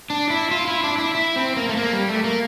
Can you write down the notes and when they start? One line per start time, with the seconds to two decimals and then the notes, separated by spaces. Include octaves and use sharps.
0.10 D4
0.30 E4
0.51 F4
0.68 E4
0.84 D4
0.98 E4
1.15 E4
1.36 C4
1.56 A#3
1.69 A3
1.77 A#3
1.93 G3
2.09 A3
2.24 A#3